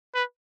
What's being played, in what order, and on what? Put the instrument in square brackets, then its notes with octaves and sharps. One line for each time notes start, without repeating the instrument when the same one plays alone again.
[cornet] B4